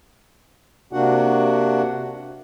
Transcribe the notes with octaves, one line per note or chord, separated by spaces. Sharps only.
C3 A#3 D4 F#4 F#5